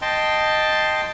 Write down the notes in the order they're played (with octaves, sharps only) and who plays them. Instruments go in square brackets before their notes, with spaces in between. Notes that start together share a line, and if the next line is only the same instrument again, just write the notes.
[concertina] D#5 G5 A5 C6